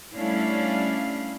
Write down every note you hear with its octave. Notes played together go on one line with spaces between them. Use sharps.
G3 A3 C#4 D4 E4 F5